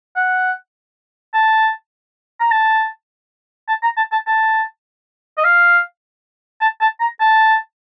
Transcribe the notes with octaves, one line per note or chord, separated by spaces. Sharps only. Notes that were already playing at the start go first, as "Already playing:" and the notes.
F#5
A5
A#5
A5
A5
A#5
A5
A5
A5
D#5
F5
A5
A5
A#5
A5